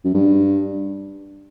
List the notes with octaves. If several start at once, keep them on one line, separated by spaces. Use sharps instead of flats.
F#2
G2